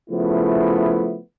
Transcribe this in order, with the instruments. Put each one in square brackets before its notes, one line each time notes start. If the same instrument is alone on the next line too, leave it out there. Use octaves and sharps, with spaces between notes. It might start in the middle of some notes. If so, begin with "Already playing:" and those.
[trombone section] C#3 F3 A3 B3 E4